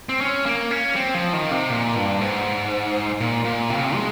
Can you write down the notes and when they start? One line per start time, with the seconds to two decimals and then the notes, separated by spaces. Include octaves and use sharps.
0.09 C4
0.21 C#4
0.46 A#3
0.71 C#4
0.96 C4
1.14 F3
1.33 D#3
1.51 C3
1.70 A#2
1.96 G2
2.21 G#2
3.21 A#2
3.44 A#2
3.70 C3
3.77 C#3
3.84 C3
3.95 G#3